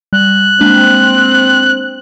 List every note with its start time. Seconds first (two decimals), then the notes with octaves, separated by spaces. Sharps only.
0.13 G3 F#6
0.61 G#3 A#3 C4 D4